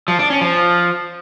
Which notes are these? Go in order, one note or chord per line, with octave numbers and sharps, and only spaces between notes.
F3
D4
C#4
F3